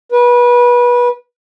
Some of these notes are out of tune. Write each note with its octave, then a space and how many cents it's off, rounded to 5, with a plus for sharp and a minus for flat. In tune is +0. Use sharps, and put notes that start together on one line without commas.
B4 -25